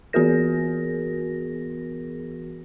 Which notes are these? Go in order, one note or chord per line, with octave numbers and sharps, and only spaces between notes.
E3 B3 F#4 G#4 A#4 A#6